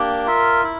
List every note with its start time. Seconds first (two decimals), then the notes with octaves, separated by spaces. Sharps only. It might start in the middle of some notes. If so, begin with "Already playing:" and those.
Already playing: A#3 D4 G4
0.26 F4 A#4 E5
0.63 E4